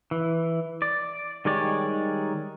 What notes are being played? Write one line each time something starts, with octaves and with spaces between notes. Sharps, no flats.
E3
D5
D#3 G3 G#3 C#5 D5